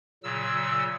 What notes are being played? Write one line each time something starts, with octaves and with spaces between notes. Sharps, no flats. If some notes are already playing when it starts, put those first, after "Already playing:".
A#2 C#3 F#3 E6